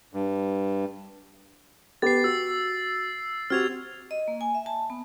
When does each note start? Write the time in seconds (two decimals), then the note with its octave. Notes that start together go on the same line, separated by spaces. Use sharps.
0.14 G2
2.02 B3 G4 A6 C7
2.24 F#4 E6
3.50 C4 F#4 G4 F6 G#6 F7
4.11 D#5
4.28 A#3
4.41 G#5
4.55 E5
4.66 A5
4.90 B3